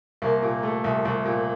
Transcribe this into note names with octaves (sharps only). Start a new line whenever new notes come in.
C2 A#3
A#2
A3
C2
C2
A#2